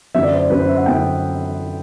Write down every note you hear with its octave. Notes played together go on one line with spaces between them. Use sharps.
F#2 D3 F#3 B3 E5
D5
C5
D5
F#2 D3 F#3 B3 B4
C5
E5
F#5
F#2 D3 F#3 B3 G5